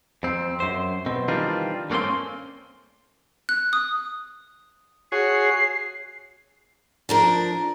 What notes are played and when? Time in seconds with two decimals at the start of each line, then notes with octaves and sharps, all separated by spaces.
0.23 F2 C4
0.60 F#2 C5
1.06 B2 C4
1.28 D#3 E3 G3 C4 D4 F4
1.90 G2 A3 A#3 C4 C#4 C6
3.49 F#6
3.73 D#6
5.12 F#4 G#4 C#5 C7
7.09 F3 D4 A#4